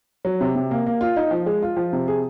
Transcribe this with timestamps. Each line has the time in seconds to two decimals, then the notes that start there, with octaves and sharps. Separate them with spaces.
0.25 F#3
0.41 C3
0.56 C3
0.71 A#3
0.86 A#3
1.01 F4
1.16 D#4
1.31 F3
1.46 G#3
1.62 F4
1.77 F3
1.93 C3
2.08 G#4